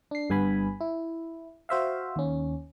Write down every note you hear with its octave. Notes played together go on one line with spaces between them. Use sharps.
D4 C7
G1 G2 B3 G#5 B5
E4
F#4 C5 E5 F5
D#2 C#4